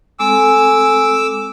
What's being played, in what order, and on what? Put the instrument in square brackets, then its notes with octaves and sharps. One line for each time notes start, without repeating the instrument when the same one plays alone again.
[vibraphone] G#3 C4 A4 [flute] G#5 [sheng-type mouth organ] D6 E6